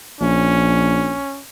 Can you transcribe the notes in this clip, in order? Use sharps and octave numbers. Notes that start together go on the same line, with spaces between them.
A#1 C#4